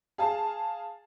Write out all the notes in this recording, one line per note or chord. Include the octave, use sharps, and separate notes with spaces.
G#4 F5 A5